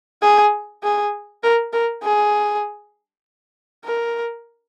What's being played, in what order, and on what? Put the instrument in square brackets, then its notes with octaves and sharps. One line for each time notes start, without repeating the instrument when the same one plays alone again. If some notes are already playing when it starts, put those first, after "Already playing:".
[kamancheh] G#4
G#4
A#4
A#4
G#4
A#4